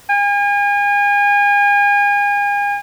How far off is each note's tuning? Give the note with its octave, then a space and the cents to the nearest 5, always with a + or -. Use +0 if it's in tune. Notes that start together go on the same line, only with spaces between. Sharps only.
G#5 -35